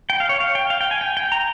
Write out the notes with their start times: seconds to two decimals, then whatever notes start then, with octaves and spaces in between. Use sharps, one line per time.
0.10 G5
0.20 F5
0.29 C#5
0.40 F5
0.55 G5
0.70 F5
0.81 G5
0.91 G#5
1.01 G5
1.17 G5
1.32 A#5